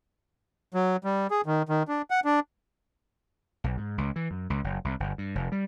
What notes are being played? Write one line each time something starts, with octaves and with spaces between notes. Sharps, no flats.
F#3
G3
G#4
D#3
D#3
D4
F#5
D4
B1
G#2
C#2
E3
F#2
C#2
F#1
C2
G1
G2
F1
G3